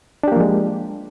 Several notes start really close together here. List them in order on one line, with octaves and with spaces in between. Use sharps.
D4 G4 A#3 F3 G#3